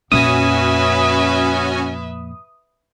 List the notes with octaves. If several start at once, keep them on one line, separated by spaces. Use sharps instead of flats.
F2 A#2 C#4 F#4 B4 E5 G#5 D#6